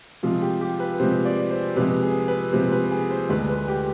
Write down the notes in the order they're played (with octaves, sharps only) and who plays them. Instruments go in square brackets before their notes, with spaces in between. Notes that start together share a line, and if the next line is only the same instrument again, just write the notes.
[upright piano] C3 F3 G#3 [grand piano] F4
[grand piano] G4
G4
B4
[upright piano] C3 F3 G#3 [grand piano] C5
[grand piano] D5
C5
[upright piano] C3 F3 G#3 [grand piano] B4
[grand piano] G#4
B4
[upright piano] C3 F3 G#3 [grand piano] C5
[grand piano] B4
G#4
C5
[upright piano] D2 D3 G#3 [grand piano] B4
[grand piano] B4
G4